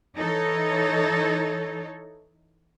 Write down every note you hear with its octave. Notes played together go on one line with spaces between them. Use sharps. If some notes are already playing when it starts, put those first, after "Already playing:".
E3 D#4 A4 C#5